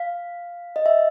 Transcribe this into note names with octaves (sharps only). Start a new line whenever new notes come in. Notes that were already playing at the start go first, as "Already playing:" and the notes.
Already playing: F5
D#5
E5